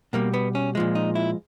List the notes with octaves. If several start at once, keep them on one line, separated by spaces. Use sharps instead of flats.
B2 G3 A#3
B3
C#4
A#2 F3 G#3
D#4
E4